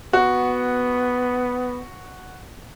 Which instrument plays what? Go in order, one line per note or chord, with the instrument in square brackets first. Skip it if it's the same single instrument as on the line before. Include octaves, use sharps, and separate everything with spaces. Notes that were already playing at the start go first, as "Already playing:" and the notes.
[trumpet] B3 [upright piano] F#4